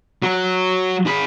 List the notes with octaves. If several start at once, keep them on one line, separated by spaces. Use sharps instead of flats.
F#3
G#4 B5